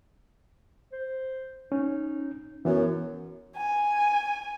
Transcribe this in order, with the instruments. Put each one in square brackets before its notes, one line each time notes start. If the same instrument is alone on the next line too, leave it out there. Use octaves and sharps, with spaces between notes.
[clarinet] C5
[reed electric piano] C#4 [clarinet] D#4
[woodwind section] F#2 [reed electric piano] E3 [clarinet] B3
[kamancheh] G#5